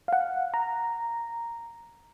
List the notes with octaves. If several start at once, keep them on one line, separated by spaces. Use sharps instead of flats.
F5 F#5
A#5